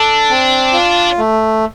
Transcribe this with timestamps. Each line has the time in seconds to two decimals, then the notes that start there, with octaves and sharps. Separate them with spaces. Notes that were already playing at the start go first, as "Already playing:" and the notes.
Already playing: D4 A4
0.30 C4
0.73 F4
1.18 A3